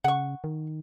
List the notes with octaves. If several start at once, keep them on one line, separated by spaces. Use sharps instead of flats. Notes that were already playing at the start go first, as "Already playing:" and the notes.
C#3 F#5 C#6
D#3